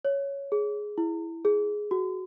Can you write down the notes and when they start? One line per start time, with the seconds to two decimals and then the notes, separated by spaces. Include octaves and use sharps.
0.05 C#5
0.52 G#4
0.98 E4
1.45 G#4
1.91 F#4